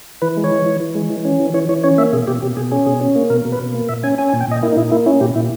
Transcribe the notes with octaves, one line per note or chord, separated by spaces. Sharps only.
E3 B4
G#3
C#5
E3
E3
E3
G#3
E3
C#4
E3
E3 C#5
E3 C#5
C#4 C#5
A#3 E5
B2 G#4
B2 G4
B2 G4
B2 G#4
C#4 G#4
B2 G#4
C#4
A#3
B2 A#4
B2
B4
B2
A#3
A#2 E5
C#4 G#5
C#4 G#5
G#5
A#2
G5
A#2 D#5
A#3 E4
D#4
A#2 E4
A#3 E4
C#4 E4
A#2 G4
A#2 E4